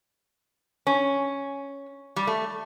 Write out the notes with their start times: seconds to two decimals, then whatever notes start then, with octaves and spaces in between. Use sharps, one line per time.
0.87 C#4
2.16 G3
2.27 A3